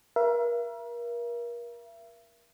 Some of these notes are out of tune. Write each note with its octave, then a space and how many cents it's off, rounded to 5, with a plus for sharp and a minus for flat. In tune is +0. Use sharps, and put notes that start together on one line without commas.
A#4 +35 E5 +40